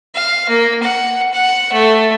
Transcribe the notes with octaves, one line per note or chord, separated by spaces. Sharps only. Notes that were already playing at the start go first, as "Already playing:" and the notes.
F5
A#3
F#5
F#5
A3